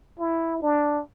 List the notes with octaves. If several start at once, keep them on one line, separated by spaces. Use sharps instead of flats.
E4
D4